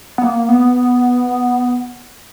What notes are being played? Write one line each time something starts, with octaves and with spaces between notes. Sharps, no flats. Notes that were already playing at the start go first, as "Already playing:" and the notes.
B3
A#3
B3